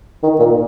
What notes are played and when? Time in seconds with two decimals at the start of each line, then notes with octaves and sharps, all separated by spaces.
0.23 D#3
0.39 A#2